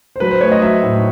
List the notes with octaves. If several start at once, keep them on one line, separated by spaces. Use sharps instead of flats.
C5
F#3 B4
C5
A3 C#5
D#5
F#3 E5
A2